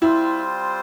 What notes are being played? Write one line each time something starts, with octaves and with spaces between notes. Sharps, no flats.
G3 C4 E4 F4 C5